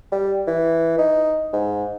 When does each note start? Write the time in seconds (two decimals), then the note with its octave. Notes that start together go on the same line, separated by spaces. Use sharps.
0.12 G3
0.47 E3
0.98 D#4
1.53 G#2